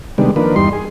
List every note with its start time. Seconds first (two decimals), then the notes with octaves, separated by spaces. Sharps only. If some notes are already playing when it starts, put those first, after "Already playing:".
0.18 C3 D#3 G3 G#3 B3 D4
0.36 D#3 F3 A#3 D4 B4
0.56 E2 G2 G3 D#4 C6
0.73 G#4